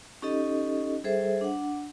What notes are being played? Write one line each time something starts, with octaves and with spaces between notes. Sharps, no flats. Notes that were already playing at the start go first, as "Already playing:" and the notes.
C#4 D#4 G4 A4 D#5
G3 G#4 A4 C5 E5
D4 F#5